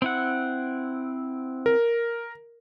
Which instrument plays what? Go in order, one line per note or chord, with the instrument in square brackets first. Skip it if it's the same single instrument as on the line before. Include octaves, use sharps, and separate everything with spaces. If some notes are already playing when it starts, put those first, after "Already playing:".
[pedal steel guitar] C4 E4 F#5
[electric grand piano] A#4